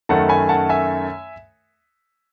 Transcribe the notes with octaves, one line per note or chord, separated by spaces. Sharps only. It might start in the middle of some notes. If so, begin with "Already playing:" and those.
F#2 D#3 A3 F#5 A5
G#5 B5
F#5 A5
E5 G#5